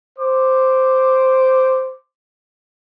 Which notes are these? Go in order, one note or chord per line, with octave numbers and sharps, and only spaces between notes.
C5 D6